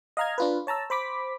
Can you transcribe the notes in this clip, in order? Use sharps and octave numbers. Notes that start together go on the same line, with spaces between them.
D#5 F5 A#5 F6 G#6
D4 F4 B4
C#5 A5 A#5 E6
C5 B5 D6 B6